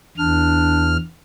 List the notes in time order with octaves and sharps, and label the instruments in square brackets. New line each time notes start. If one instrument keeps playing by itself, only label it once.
[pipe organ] E2 F6 [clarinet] D4